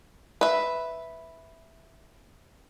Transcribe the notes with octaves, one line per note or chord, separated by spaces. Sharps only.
B4 E5